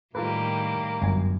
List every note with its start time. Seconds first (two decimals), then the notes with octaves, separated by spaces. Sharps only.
0.15 A2 D#3 G3 A#3 F4 A4 B4
1.02 G1 F#2 G#5